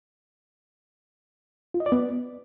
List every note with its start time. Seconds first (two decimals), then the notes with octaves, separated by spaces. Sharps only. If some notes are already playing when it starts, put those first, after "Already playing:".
1.74 F4
1.80 D#5
1.86 D5
1.92 B3